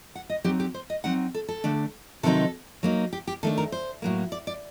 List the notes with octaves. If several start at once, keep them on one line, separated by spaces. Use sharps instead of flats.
F#5
D#5
F#3 C4 D#4 G4
G4
C5
D#5
F#3 C4 D#4 F#5
A4
A4
D3 A3 D4
C3 D#3 F#3 C4 D#4 A4
F#3 A#3 D#4
G4
G4
D#3 A3 D4 A4
A#4
C5
A2 F#3 A#3
D5
D5